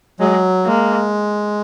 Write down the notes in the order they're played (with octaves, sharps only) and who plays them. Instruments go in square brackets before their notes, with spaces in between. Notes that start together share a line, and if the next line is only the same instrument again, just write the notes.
[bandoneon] F#3 [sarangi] G#3
[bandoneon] G#3 [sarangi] A#3